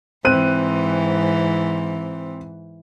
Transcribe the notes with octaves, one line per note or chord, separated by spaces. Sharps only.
G#2 E3 C4 F#6 D#7